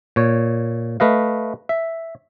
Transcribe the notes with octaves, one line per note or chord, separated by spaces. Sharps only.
A#2 C#5
A3 B4 D#5 F5
E5